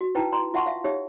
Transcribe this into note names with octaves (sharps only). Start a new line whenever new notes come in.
F#4
D#4 E4 B4 G5 A5 A#5
A#5 C6
F4 E5 F#5 A5 C6 C#6
E5 F5
D#4 G4 C#5 E5